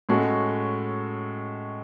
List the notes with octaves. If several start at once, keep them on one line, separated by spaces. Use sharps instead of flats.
A2 G#3 C#4 F#4 A4